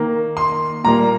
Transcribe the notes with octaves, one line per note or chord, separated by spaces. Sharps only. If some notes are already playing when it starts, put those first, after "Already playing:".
Already playing: D#3 A#3
C6
A#2 G3 A#3 A#5